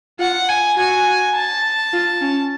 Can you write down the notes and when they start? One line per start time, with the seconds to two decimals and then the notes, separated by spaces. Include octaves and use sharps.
0.19 F4 F#5
0.49 G#5
0.77 F#4 G#5
1.35 A5
1.93 F4
2.21 C#4